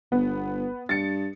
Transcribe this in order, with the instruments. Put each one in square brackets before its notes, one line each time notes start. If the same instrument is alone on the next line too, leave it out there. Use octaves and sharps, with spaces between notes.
[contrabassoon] G1 [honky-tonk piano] B3
[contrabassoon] G2 [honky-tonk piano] A6 C#7